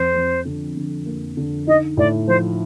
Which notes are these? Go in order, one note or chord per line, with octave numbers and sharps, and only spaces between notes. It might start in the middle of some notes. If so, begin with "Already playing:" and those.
Already playing: F2 C5
F2
D3
D3
A#3
D3
D#4 D#5
A2 D5
F3 C5